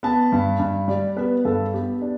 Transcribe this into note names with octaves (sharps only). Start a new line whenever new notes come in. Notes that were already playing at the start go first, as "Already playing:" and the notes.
B3 A5
G2
G2
G3 D5
B3 B4
G2 A4
B3 G4
D4